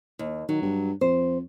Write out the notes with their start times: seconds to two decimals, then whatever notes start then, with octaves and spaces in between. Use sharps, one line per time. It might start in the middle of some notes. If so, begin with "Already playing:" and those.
0.19 D#2
0.49 D#3 F#3
0.62 G2
1.01 F2 C5